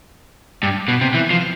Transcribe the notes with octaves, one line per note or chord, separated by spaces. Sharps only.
G2
B2
C3
E3
F3